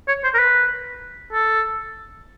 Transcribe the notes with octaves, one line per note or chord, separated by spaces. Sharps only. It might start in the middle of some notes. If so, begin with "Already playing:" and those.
C#5
C5
A#4
B4
A4